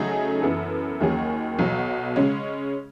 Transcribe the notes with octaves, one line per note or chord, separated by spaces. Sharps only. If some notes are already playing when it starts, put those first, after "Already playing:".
Already playing: C#3 F#3 A3 D#4 G#4
F#2 E3 B3 E4 A4
D#2 D#3 F#3 C#4 G#4
B1 B2 F#3
C#3 G#3 C#4